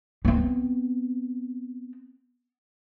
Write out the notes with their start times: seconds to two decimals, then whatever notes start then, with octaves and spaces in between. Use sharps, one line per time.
0.25 B3 C4